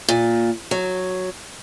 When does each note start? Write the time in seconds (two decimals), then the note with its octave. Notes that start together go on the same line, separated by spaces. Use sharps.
0.09 A#2
0.71 F#3